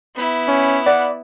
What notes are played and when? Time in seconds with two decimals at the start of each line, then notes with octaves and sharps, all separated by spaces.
0.15 B3 E4
0.48 C#4
0.86 D5 F#5